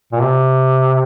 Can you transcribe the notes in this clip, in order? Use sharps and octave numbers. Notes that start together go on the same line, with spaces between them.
A#2
C3